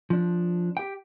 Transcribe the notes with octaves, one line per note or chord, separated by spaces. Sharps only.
F3 D4
G4 G5